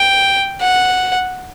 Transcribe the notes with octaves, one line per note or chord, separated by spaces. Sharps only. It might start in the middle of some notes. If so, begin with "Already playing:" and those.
Already playing: G5
F#5